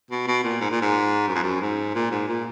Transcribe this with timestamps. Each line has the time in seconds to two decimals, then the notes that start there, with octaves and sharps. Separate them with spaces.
0.11 B2
0.28 B2
0.44 A#2
0.61 G#2
0.71 A#2
0.82 G#2
1.28 F#2
1.35 F2
1.43 F#2
1.62 G#2
1.95 A#2
2.11 G#2
2.28 A#2